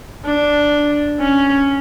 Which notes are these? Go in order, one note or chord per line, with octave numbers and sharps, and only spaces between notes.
D4
C#4